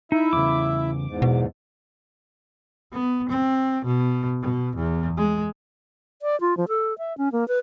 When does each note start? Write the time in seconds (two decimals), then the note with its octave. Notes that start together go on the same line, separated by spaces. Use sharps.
0.12 D#4 E4 E5
0.33 E2 C#3 D6
1.06 E2 G#2
1.22 B1 B2
2.92 B3
3.29 C4
3.85 B2
4.41 B2
4.76 E2
5.17 G#3
6.22 D5
6.41 F4
6.57 F3
6.68 A4
6.98 E5
7.18 C#4
7.32 A#3
7.48 B4